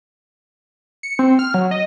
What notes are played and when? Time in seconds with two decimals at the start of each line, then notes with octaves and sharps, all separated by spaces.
1.03 C#7
1.19 C4
1.39 F6
1.54 F#3
1.71 D#5